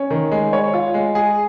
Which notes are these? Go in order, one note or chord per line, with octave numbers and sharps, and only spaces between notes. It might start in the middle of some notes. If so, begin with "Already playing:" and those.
Already playing: C#4
D#3
G#3
C#5
F4
G#3
G#4